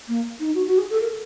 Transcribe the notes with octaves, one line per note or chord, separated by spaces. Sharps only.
A#3
D#4
F#4
F#4
G#4
A4
A#4